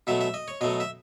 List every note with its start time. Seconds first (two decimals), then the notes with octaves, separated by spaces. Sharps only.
0.07 B2 F#3 A3 E5
0.21 E5
0.34 D#5
0.48 C#5
0.61 B2 F#3 A3 D#5
0.80 E5